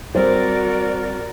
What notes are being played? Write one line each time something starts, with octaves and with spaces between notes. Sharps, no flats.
G3 C4 F#4 A#4 C5 D5